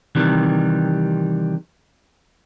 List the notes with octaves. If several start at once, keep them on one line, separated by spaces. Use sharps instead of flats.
C3 D#3 E3 G3